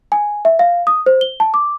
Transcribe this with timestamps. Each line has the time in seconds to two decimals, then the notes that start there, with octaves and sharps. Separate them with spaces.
0.12 G#5
0.45 E5
0.59 F5
0.87 D#6
1.06 C5
1.21 G7
1.40 A5
1.54 D6